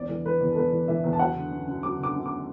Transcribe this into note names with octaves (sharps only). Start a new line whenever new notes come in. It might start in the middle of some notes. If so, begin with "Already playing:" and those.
Already playing: E2 D5
E3
E3 B4
E2
A4
E2 B4
E3
E3 E5
E2
A5
F#3 F#5
D3
F#2
F#2
F#3 D6
D3 D6
F#2
D6